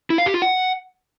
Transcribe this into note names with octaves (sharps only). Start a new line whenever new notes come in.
E4
F5
G4
F4
F#5